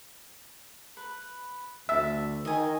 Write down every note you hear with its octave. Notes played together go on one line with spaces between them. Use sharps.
B4
D2 E5 A5
D#3 D#5 G#5